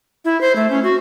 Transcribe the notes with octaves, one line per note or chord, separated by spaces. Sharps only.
E4
C5
A3
C#4
F#4